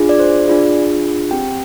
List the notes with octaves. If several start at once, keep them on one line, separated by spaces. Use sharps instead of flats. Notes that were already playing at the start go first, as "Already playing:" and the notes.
Already playing: D4 F4 G#4
D5
C5
D4 F4 G#4 D5
C4 G4 G5